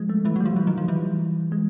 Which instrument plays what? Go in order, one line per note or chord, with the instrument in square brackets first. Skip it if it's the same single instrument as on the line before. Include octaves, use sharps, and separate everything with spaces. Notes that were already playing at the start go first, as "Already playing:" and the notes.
Already playing: [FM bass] F3 [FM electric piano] G#3
[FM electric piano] A3
[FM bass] E3 [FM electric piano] A3
[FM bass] F#3 [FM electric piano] G3
[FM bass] F3
[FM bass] E3 [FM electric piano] F#3
[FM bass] D#3
F3
[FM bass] E3 [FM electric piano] G3
[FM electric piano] G#3